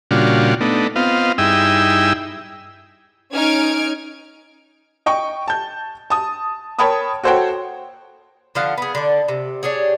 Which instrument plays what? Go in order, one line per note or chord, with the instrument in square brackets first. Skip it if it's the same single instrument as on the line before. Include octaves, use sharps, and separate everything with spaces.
[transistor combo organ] A#2 C#3 G3 D4 F4 F#4
A3 B3 D4 D#4
B3 C4 F4 D#5 F5
G2 D#4 E4 G#4 G5 E6
[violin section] C#4 D#4 F6 G#6 D7
[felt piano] D#5 G5 C#6
A5 G6
A5 D#6
A#4 C#5 G5 A5 B5 D#6
F#4 A4 C5 C#5 F#5 G5
[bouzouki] D3 F3 F5 F#5
B3 G#4
D3 D5
C3
D4 G4 G#4 C#5